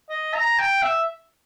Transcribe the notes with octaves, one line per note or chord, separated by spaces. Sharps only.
D#5
A#5
G5
E5